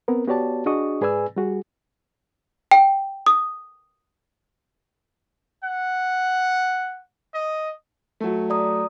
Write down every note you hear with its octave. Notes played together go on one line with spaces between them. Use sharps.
B3 C4 A#4
B3 F#4 G4 C#5 D5 A5
D4 F#4 G#4 D#5 C#6 D#6
G#2 G#4 B4 D5 G#5 E6
G3 F#4 G#4
G5
D#6
F#5
D#5
F#3 A3
D5 A#5 D#6